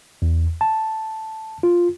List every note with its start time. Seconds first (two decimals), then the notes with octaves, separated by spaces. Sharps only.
0.22 E2
0.61 A5
1.63 F4